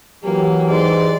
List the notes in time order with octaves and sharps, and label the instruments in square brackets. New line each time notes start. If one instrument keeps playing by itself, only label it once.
[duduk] E3 [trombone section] F#3 G4 [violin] A#3
[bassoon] G#2 [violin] D5 C6